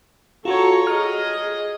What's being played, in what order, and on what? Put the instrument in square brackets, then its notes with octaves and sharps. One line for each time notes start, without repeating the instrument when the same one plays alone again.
[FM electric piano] F4 F#4 [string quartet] A4 C#5 A#5
[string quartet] G#4 D#5 [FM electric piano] F6